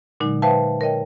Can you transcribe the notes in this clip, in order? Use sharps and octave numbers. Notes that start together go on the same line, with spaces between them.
A#2 D3 F#3 G#3 D#4
B4 C5 E5 F5 G5 A5
A#4 C#5 D#5 G5